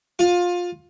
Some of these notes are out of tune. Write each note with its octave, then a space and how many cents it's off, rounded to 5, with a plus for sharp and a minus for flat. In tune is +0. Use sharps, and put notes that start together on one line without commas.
F4 +20